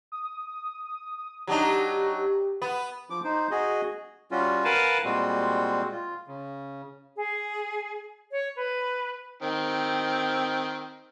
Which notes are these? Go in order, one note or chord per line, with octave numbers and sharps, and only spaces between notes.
D#6
F#3 D4 D#4 G4
B3
F3 D6
D#4 C5
F#4 G#4 D#5
G3 C#4 F4 F#4
A#4 B4 F5 F#5 G#5 A5
A#2 G3 G#3 C4 F#4
F4
C#3
G#4
C#5
B4
D#3 C4